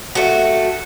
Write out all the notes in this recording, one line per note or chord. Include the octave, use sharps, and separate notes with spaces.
A3 F#4